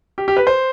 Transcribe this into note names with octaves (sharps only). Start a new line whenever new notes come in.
G4
G4
B4
C5